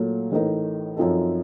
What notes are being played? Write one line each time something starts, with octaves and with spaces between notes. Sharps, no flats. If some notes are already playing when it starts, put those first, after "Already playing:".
Already playing: A#2 F#3 A3
A1 A2 A3 D#4 A#4
F#2 F3 C4 D#4 A4